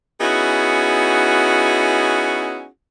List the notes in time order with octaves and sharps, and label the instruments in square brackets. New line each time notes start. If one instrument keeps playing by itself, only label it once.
[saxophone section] B3 C#4 D#4 E4 F#4 G#4